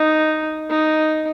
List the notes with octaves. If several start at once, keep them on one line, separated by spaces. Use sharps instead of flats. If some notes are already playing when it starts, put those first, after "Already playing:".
Already playing: D#4
D#4